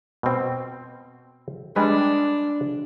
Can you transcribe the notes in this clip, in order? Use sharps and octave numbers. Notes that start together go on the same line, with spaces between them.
B2 C4
G3 G#3 D4 B4